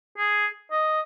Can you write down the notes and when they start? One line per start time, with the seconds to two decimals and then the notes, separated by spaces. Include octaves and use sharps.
0.18 G#4
0.72 D#5